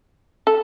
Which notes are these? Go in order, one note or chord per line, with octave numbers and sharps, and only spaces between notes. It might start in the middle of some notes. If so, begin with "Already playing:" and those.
A4